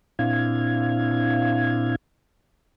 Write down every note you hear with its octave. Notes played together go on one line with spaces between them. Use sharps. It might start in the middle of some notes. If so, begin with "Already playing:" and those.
A#2 C4 D4 E4 F5 G#6